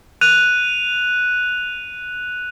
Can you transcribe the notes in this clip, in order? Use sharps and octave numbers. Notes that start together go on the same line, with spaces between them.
F#6 D#7 F7